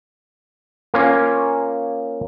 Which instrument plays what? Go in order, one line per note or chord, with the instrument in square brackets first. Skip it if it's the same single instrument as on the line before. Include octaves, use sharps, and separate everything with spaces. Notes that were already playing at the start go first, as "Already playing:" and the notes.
[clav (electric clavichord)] A#3 C#4 F4